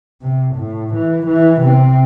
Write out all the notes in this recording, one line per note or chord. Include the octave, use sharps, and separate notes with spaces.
C3
A2
E3
E3
C3 C4